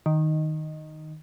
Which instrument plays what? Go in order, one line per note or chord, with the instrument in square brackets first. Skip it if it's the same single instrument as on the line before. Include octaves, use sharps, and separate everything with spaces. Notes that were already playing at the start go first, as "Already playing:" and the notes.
[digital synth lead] D#3